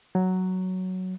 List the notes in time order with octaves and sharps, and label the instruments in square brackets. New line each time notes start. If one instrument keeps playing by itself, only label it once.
[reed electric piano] F#3